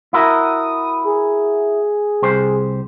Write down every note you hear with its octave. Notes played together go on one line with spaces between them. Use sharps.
E4 F#4 A#4 D#6
G#4
C2 G4 C5